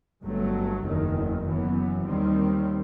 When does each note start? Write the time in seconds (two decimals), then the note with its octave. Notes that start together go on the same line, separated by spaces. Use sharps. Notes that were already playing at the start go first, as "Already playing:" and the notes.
0.23 G1 G2 F#3 A3
0.84 F#1 E2 D#3
1.44 F#2 E3 B3
2.05 D#2 D#3 G3 C4